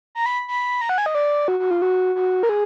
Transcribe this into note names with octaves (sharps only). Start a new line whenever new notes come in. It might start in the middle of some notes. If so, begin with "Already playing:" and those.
A#5
B5
B5
A#5
F#5
G#5
D#5
D5
F#4
F#4
F4
F#4
F#4
A#4
G#4